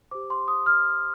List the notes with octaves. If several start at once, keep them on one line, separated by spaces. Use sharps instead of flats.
G4 C5 D6
C6
D#6
F6